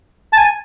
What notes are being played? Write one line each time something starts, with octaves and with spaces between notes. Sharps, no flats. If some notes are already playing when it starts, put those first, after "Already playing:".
A5
G#5